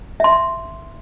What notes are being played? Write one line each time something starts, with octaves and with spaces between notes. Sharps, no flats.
E5 C6